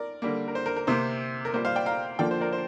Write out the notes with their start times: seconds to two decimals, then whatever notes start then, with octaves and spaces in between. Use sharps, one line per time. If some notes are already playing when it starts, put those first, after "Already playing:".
Already playing: A#4 D5
0.22 D3 G3 A#3
0.48 A#4
0.55 C5
0.66 A#4
0.76 A#4
0.87 C3 A#3 C5
1.45 A#4
1.54 A#2 G3 A#3 C5
1.65 C5 F5
1.75 D5 G5
1.86 F5 A#5
2.19 D3 F3 A#3 D5 G5
2.31 C5
2.41 A#4 D5
2.53 C5